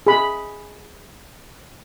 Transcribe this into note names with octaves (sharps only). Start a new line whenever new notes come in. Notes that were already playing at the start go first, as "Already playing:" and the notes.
G#4 B5